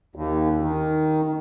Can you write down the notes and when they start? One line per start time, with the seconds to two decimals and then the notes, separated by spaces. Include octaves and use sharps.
0.16 D#2
0.62 D#3